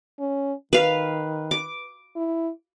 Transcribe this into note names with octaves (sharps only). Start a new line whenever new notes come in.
C#4
D#3 B4 F5
D6
E4